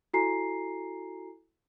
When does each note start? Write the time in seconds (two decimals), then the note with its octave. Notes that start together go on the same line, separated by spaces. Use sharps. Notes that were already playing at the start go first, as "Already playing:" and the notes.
0.14 E4 F#4 A4 G#5 A#5 C7